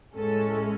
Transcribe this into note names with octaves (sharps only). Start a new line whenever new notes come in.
A2 G#3 C#4 A4